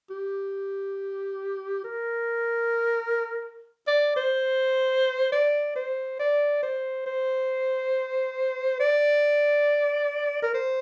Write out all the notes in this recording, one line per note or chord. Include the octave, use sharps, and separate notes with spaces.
G4
A#4
D5
C5
D5
C5
D5
C5
C5
D5
A#4
C5